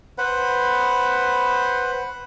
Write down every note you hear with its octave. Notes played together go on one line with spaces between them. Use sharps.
B4 C5 F#5 B5